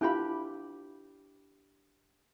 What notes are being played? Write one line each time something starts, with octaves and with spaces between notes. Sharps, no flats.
D4 E4 F4 G4 B5